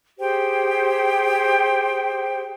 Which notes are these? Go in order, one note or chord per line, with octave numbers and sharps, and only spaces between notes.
G4 G#4 C5 G5